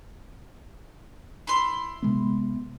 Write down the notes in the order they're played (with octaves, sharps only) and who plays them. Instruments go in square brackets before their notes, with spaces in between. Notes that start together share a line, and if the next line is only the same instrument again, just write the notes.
[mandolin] E4 B5 C6
[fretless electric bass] C3 G#3 B3